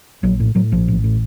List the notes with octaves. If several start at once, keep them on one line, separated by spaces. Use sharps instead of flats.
A#1 F#3
A2
A2 F#3
A#1 F3
A1
A2